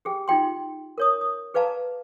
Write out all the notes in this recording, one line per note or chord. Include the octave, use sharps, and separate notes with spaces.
G4 G#4 G5
D#4 F4 G5 C6
A#4 C#5 D#6
D#6
G#4 B4 D5 F5 A5 A#5